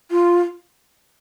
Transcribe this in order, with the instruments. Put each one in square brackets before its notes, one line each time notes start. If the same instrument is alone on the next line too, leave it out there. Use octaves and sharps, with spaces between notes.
[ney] F4